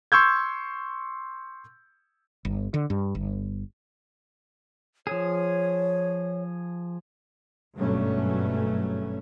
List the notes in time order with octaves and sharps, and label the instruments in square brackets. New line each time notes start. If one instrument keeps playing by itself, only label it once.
[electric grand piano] C6 C#6 E6 G6 G#6
[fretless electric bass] G1
D3
G2
G1
[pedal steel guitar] F3 G#4 [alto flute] C#5
[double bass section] G#1 G2 B2 F#3 A3 C#4